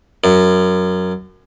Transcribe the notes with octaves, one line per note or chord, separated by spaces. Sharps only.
F#2